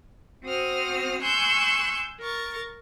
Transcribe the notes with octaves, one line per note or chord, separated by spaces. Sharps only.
C4 F#4 C5 D#6 F6
G#5 C6 C#6 E6 F#6 G6
A#4 C#6 A6